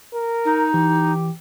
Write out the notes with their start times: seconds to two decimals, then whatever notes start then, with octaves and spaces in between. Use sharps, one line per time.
0.13 A#4
0.45 D#4
0.74 E3 G4